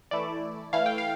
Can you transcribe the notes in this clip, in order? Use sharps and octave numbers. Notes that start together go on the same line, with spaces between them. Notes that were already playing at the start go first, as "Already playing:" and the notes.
E3 A3 E4 D5
E3 A3 E4 F5
G5
F5